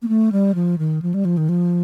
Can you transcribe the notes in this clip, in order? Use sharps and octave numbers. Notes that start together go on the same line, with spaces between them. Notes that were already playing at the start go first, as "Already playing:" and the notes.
A#3
A3
G3
F3
D#3
F3
G3
F3
D#3
F3